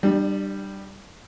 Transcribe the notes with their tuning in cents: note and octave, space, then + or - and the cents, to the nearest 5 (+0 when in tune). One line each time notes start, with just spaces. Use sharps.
G3 -5 D4 +30